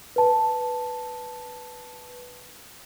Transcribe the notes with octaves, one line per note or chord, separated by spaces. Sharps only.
B4 A5